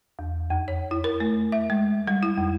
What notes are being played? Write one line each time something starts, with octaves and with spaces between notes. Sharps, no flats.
E2
F2
C#5
E4
A#4
A3
E5
G#3
G3
E4
F2